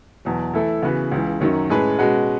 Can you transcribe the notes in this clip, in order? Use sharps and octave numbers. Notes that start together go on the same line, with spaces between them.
E2 B2 F#3
E3 A3 E4 A4
C#3 E3 B3 F#4 B4
C#2 C#3 E3
F#2 D#3 F#3 C#4
A2 G#3 C#4 G#4 B4
B2 G#3 C#4 F#4 B4